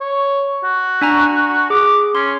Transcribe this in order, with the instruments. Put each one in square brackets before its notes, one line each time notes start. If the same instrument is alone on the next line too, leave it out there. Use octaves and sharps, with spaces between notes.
[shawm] C#5
F#4
[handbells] D4 G#5 A#5
[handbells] G#4 [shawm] D6
[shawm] C#4 [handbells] C6